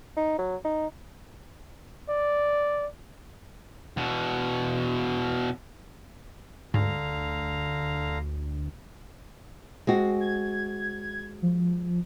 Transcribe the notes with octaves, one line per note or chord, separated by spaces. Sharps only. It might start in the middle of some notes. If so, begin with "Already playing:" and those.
D#4
F#3
D#4
D5
E2 B2
D2 G#2 D3 F5 A#5
G#3 C4 F#4
G#6
F3